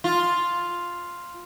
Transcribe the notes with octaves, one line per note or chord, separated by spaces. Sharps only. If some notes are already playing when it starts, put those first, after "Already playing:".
F4